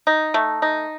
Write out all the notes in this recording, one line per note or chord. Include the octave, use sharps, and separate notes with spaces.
D#4
A3
D#4